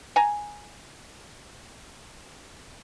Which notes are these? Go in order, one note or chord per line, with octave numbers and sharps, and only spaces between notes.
G#5 A#5